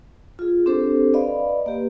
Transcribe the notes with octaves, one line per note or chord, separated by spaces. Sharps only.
F4 G#4
C4 D4 G4 A4 C5
B4 D5 D#5 F5 B5
A#3 G4 B4